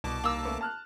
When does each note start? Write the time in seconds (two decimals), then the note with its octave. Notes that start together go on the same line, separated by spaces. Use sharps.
0.04 C2 B2 A5 D6
0.24 D#2 A#3 E6
0.45 A3 B3 C#4
0.61 A5 F6 F#6